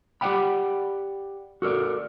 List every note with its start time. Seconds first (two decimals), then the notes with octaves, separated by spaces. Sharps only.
0.21 G4 D5 D#5 F#5 G5 B5
1.62 F#4 A4 A#4 D5